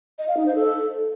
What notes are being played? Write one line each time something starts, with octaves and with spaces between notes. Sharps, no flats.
D#5
F5
D#4
C5
A4